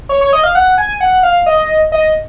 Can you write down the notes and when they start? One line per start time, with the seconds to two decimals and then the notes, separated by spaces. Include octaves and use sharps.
0.09 C#5
0.21 C#5
0.33 D#5
0.43 F5
0.55 F#5
0.78 G#5
1.00 F#5
1.23 F5
1.46 D#5
1.92 D#5